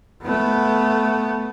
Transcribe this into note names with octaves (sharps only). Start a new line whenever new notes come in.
A3 B3